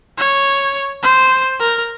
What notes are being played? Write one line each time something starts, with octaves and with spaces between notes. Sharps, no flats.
C#5
C5
A#4